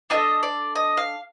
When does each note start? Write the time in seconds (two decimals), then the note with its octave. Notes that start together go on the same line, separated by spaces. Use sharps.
0.10 D4 F4 A4 D#5
0.43 D5
0.75 D#5
0.97 F5